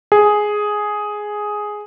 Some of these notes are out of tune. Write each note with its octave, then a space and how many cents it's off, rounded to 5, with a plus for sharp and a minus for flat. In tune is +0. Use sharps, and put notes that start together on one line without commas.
G#4 +5